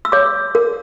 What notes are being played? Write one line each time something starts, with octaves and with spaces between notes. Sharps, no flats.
E6
C#5 D6
A#4